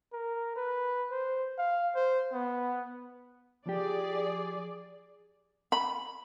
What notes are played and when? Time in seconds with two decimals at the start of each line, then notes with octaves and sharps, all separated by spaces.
0.12 A#4
0.56 B4
1.11 C5
1.58 F5
1.95 C5
2.33 B3
3.66 F3 G4 G#4 D5
5.72 B5